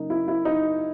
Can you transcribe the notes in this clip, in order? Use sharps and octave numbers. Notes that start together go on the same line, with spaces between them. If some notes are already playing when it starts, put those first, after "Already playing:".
Already playing: C#3 F#3 A#3 D#4 A#4
E4
E4
D#4